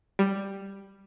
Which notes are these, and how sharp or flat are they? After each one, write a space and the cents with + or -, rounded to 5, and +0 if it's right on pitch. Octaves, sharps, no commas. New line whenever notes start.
G3 +5